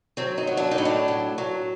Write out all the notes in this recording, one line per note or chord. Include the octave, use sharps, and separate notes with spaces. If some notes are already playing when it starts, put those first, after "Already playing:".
F#3 C4
D#4
F#3
D4
D#4
A2
D4
F#3
F#3